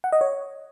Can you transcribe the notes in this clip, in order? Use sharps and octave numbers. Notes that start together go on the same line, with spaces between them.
F#5
D#5
C#5